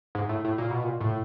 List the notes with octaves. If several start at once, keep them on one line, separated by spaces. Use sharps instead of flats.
G#2
A2
A2
A#2
B2
A#2
A2